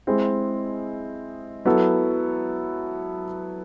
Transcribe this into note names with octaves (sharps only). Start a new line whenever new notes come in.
G#3 C4 E4 G#4
F#3 B3 E4 A4